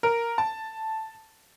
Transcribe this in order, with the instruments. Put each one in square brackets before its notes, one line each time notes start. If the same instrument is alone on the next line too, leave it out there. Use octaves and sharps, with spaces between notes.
[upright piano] A#4
A5